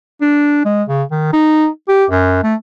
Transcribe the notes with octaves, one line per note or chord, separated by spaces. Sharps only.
D4
G#3
C#3
D#3
D#4
G4
F#2
A3